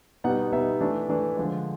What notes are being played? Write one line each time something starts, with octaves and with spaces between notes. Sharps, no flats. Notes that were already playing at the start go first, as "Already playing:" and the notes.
B2 G3 B3 D#4 F#5
B2 G3 B3 D#4 E5
E3 A3 D4
E3 A3 D4
D3 F3 G#3